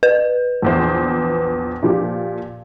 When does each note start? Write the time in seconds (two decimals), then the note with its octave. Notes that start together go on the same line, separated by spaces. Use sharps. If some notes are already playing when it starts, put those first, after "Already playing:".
0.03 B4
0.62 A#1 E2 C5
1.83 A#2 F3 G4